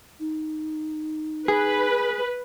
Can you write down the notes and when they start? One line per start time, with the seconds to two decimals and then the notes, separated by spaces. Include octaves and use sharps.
0.20 D#4
1.48 G#4 B4